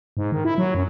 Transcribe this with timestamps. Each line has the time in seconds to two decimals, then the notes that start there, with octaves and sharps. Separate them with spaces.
0.17 G#2
0.32 D#3
0.45 E4
0.58 F#3
0.74 F#2